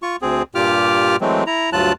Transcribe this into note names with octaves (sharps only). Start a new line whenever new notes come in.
F4 C#6
D2 C4 G#4
G2 A#2 F4 G4 D6 F6
E3 F#3 G#3 A3 C4
E4 A#5
D2 G2 F#3 F4 A5 F#6